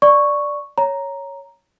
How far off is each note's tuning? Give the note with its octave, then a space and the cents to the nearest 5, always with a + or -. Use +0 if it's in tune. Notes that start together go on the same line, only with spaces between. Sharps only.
D5 +0 C#6 +0
C#5 +0 A#5 +0